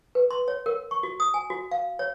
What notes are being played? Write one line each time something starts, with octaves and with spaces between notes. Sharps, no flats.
B4
C6
C#5
A#4
C#6
F#4
D#6
G#5
F#4
F5
C#5